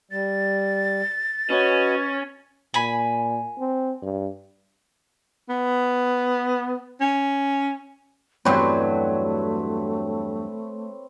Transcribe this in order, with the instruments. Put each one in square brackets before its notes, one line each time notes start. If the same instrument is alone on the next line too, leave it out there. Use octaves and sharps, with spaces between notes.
[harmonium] G3 [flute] A6
[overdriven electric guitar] C#4 [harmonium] F#4 B4 D#5
[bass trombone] A#2 [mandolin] G#5 B5
[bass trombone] C4
G2
[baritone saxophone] B3
C#4
[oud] E2 G2 F#3 [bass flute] A3 [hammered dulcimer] C4 B4 C#5